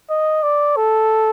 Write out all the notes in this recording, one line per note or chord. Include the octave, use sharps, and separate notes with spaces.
D#5
D5
A4